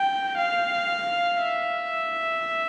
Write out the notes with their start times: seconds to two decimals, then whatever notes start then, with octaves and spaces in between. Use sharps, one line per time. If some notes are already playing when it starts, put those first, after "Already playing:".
Already playing: G5
0.38 F5
1.39 E5